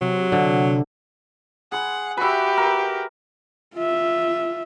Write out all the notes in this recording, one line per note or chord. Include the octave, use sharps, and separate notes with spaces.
C3 F#3
D3
G#4 F#5 C6
F#4 G4 B4 E5
A#4
F4 E5